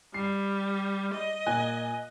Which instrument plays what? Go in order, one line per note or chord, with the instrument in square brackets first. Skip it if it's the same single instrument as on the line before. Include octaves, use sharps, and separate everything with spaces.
[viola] G3 [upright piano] C7
[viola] D#5
[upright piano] A#2 G#5 F#6